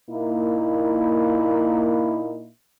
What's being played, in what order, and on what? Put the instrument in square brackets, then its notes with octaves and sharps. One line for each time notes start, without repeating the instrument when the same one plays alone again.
[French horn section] A#2 A#3 D#4 E4